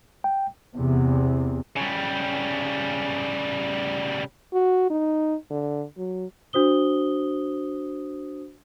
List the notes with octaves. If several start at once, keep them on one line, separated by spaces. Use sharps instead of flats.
G5
E2 C3
C#3 G3
F#4
D#4
D3
F#3
D4 F#4 C5 D#6 G7